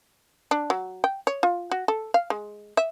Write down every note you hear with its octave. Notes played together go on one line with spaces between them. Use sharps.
D4
F#3
G5
C#5
F4
F#4
A4
F5
G#3
E5